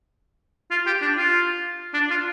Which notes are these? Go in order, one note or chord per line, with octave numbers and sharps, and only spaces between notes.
F4
G4
D4
F4
D4
F4